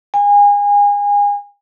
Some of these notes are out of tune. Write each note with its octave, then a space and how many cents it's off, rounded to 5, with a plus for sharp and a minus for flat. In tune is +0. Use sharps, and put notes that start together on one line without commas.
G#5 -30